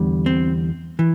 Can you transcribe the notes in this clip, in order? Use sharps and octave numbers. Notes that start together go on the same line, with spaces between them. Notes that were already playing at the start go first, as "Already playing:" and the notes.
Already playing: E2 D3 G3
C4
E3